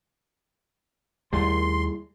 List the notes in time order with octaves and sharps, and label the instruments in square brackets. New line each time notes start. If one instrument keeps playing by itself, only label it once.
[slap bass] D#2 A3 [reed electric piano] G3 E4 G#4 [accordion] C6